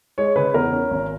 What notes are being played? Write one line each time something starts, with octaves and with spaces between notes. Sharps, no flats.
G#3 C#5
C#3 B4
E2 A#4
C#4
G#1